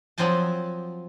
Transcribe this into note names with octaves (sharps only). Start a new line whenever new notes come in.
F3 F#3 C4 C5 G#5 A5